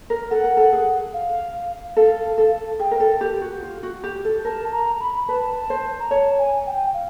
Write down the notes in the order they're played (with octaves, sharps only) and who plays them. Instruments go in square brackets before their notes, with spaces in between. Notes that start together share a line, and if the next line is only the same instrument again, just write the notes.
[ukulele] A#4
[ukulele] A4 [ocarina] F#5
[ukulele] A#4
A4
G#4
[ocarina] F5
[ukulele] A4 [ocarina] F5
[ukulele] A4
[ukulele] G#4 [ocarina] G5
[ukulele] A#4
A4
G4
F#4
F4
F#4
G4
A4
[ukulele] A#4 [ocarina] A5
[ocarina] A#5
B5
[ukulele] B4 [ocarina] A5
[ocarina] A5
[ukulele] C5
[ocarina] A#5
[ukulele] C#5 [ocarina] A5
[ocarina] G#5
G5
F5